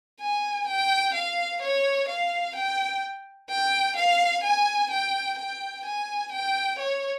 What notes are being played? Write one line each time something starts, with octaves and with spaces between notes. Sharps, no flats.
G#5
G5
F5
C#5
F5
G5
G5
F5
G#5
G5
G5
G#5
G5
C#5